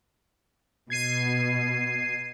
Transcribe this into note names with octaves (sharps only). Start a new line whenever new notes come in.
B2 G#6 C7 D#7